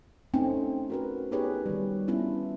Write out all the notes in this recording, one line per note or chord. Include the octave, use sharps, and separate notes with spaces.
A3 C4 C#4 D#4 E4
F#4 A#4 B4
B3 D#4 G4 G#4 B4 C#5
D#3 G3
B3 C#4 D4 E4 F4